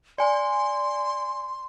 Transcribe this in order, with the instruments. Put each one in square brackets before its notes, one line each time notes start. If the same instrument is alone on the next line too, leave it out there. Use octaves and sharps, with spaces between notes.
[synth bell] D5 G#5 [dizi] C6